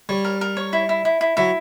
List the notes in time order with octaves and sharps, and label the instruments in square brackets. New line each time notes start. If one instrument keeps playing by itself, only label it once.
[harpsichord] G3 [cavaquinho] C#5
[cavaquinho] A#4
A#4
C#5
E4
E4
E4
E4
[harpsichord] F#3 [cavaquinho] E4